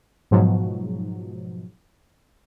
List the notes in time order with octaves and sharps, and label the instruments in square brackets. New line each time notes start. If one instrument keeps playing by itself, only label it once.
[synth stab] G#2 B2 F3 F#3